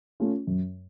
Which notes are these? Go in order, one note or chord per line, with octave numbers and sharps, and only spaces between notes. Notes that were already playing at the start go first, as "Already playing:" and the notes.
A3 C#4 F4
F#2